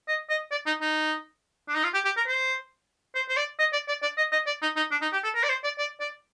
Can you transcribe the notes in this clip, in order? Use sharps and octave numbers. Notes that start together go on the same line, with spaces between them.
D#5
D#5
D5
D#4
D#4
D4
D#4
F4
G4
G4
A#4
C5
C5
C5
D5
D#5
D5
D5
D5
D#5
D#5
D5
D#4
D#4
D4
D#4
G4
A4
A#4
D5
C5
D5
D5
D5